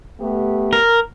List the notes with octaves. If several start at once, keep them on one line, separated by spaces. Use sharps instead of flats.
A3 B3 G4
A#4